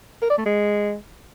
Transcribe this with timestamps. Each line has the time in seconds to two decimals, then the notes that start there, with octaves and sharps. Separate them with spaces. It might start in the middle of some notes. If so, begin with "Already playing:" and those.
0.22 A#4
0.30 D5
0.38 A3
0.46 G#3